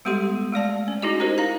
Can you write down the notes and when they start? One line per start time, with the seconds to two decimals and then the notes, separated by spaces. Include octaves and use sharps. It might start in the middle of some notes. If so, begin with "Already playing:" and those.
0.05 G3 G#3 B3 G4 A4 C6
0.52 G#3 A3 D5 A5
0.88 C#4
1.02 D#4 E4 F#4 G#4 D#5
1.20 D#4 G4 A#4 C5 D#5
1.38 D#4 F5 A#5